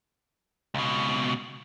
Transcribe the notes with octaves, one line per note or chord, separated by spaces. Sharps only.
C#2 B2